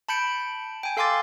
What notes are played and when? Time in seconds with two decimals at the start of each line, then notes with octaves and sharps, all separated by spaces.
0.09 A5 B5 G6 C#7 D7
0.83 G5 G#5
0.97 A4 F5 G#5 C6 D6 A6